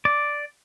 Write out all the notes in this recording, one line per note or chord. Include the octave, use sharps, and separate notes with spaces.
D5